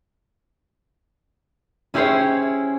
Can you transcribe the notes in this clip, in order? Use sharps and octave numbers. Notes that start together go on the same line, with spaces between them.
C#4 E4 G4 G#4 C5 C#5